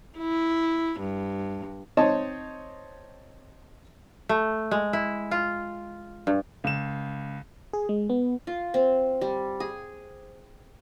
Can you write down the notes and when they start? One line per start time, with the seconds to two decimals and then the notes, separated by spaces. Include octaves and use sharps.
0.18 E4
1.00 G2
1.97 C4 D#4 C#5 D#5 A5
4.29 A3
4.71 G#3
4.93 E4
5.31 F4
6.27 G2
6.64 C#2 E7
7.73 G#4
7.89 G#3
8.10 B3
8.47 F4
8.74 C4
9.21 G3
9.60 G#4